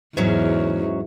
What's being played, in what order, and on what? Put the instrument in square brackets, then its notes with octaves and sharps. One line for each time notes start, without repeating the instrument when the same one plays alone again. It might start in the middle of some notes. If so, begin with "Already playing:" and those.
[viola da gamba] E2 [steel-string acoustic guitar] G#2 F#3 C#4